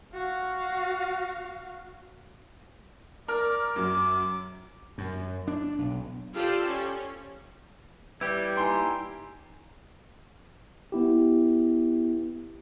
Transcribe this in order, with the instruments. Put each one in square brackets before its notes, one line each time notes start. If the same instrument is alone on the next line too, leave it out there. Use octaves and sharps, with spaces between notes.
[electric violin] F#4 F5
[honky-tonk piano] A#4 F6 [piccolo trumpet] D5
[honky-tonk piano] F#2 F#3 [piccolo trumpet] D6
[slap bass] F#2
D4
B1
[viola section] F4 G4 A4 C5 D5
C#4
[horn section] G3 [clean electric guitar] E4 G4 [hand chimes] B4 E5
[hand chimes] D#4 G#5 A#5 [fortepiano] C6
[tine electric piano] B3 E4 G4